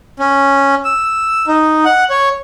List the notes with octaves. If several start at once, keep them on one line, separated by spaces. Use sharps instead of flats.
C#4
E6
D#4
F#5
C#5